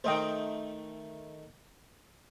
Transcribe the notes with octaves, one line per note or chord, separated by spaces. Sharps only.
D#3 A3 C5 D#5 G5